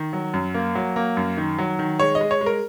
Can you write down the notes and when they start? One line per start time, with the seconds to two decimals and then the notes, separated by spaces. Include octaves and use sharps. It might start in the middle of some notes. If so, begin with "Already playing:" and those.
Already playing: D#3
0.13 F#3
0.34 F#2
0.54 A#3
0.75 F#3
0.96 A#3
1.17 F#2
1.37 D#3
1.59 F#3
1.79 D#3
2.00 G#3 C#5
2.15 D#5
2.21 G#3
2.31 C#5
2.41 G#3
2.46 A#4